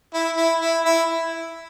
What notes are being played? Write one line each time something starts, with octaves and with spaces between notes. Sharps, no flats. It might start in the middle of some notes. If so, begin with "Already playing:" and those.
E4
E4
E4
E4